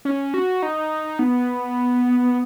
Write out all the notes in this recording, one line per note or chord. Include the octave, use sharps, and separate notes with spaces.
C#4
F#4
D#4
B3